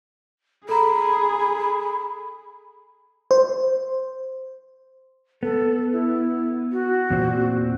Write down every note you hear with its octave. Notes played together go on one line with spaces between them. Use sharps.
G#4 A4 A#5 B5
C5
B3 A4
E4
F#4
E2 A#2 C4